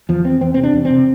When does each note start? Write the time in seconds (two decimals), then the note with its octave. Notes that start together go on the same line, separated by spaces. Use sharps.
0.09 E2 F3
0.24 E2 C4
0.41 E2 C4
0.54 C3 C4
0.63 D4
0.73 E2
0.85 C4
0.90 C3